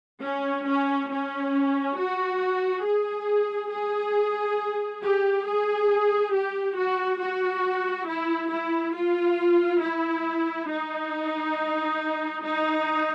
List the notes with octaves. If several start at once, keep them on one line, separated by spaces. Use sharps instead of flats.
C#4
C#4
C#4
F#4
G#4
G#4
G4
G#4
G4
F#4
F#4
E4
E4
F4
E4
D#4
D#4